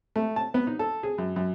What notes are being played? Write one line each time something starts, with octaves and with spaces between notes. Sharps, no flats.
A3
A5
B3
D#4
A4
G#4
F#2
F#2